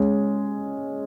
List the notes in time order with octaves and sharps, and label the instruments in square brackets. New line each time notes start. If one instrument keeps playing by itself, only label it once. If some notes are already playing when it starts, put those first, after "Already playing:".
Already playing: [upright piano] G#3 C#4